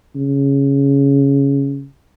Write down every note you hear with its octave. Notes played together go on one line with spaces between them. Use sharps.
C#3